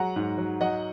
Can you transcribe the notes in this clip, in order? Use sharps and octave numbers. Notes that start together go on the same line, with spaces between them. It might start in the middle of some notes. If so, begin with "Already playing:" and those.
Already playing: F#3 G#3 F#5 A#5
G#2
F#3
F#3 D#5 F#5